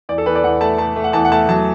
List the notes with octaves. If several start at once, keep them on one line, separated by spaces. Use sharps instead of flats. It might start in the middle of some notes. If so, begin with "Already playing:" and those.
E2 D5
A4
E2 B4
D5
E2 F#5
A3 A5
A3 A5
A3
F#5
E2 A5
F#5
A3 A5
F#3 A5